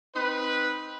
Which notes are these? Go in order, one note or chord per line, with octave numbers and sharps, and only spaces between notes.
C4 D#4 B4